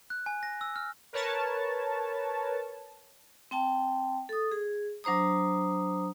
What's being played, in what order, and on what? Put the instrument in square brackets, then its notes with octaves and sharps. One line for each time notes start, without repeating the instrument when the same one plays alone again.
[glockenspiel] F#6
G#5
A#6
E6
F6
[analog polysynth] A#4 B4 C#5 A5
[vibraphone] C4 G5 A5
A4 D#6
G#4
F#3 D4 C5 A#5 D#6